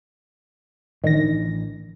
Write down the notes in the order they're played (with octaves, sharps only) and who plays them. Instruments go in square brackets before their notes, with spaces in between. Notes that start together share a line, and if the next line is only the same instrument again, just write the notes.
[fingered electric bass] A1 E3 D4 [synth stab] D#3 A#6